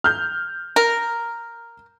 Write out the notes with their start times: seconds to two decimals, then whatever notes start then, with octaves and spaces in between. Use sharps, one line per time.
0.04 F6 G6
0.76 A#4